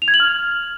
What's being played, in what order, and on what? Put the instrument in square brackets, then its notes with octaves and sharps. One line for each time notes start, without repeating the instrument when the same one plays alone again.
[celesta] F7
G#6
F#7
F6